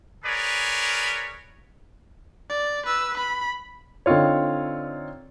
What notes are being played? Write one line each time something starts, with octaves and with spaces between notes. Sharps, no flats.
G#4 A#4 B4 C#5 D5
D5
B4 E6
B5
D3 C4 D#4 F4 C#5